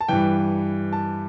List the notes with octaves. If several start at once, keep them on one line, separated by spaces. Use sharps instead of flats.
A5
G2 E3 G5
A5